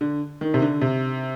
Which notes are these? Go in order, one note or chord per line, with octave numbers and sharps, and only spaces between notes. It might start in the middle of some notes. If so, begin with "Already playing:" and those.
D3
D#3
C3
D3
C3